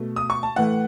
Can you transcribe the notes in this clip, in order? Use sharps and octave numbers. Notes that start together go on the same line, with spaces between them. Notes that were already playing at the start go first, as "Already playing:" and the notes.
Already playing: B2 A3
D#6
C#6
A5
A2 E3 A3 F#5